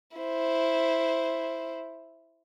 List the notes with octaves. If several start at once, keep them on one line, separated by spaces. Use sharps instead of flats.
E4 C5